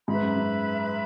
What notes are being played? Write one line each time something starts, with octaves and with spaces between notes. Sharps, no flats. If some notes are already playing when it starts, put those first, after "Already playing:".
G#2 B4 E5 B5
F#2
F#2